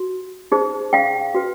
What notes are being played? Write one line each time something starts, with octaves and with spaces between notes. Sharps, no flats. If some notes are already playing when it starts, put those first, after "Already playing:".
Already playing: F#4
D#4 G#4 C5
F5 G5
F#4 B4